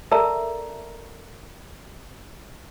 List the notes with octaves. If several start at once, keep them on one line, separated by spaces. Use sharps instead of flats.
A4 A#4 D5 E5 A5 A#5